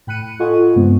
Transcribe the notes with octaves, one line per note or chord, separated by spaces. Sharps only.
A2 G5 B5 F#6 C#7 D#7
F4 A4 D#5 F#5 G#5 C#6
G2 C#3 G#3 B3 C4